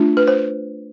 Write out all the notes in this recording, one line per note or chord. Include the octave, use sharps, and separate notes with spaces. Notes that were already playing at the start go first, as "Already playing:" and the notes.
Already playing: A3 D4 F4
B4
C5